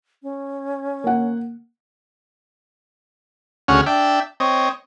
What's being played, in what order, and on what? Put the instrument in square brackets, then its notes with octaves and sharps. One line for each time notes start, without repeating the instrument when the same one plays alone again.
[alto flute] C#4
[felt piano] A#3 F#5
[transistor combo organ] D2 C#3 C#4 F#4 F#5 F6
D4 E5 G5
C4 C#5 D#5